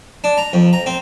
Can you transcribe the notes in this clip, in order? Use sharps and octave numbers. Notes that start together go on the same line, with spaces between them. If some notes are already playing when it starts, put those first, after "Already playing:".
D4
A#5
F2
A#5
C4